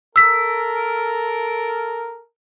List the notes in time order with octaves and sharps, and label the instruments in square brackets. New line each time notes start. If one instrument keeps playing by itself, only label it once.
[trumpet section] A4 A#4 [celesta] E6 B6